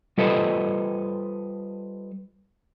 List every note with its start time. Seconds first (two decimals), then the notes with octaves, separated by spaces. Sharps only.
0.18 G3 F4 A4 B4 C5 D#5